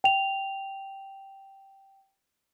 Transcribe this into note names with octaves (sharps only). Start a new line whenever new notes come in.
G5 F7